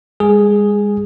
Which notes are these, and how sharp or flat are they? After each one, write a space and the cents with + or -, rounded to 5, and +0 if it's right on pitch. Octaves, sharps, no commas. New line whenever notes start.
G#3 -35 G#4 +0